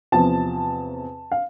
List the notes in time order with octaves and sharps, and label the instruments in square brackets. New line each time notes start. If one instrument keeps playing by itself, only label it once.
[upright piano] E2 C3 F3 A5
F5